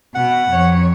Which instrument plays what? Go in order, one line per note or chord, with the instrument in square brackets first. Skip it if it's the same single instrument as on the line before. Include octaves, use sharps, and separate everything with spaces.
[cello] B2 [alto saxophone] F#5
[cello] F2 C#5